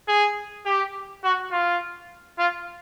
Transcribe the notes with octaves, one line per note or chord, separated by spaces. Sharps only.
G#4
G4
F#4
F4
F4